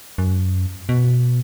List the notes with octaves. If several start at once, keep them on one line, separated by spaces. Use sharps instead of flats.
F#2
B2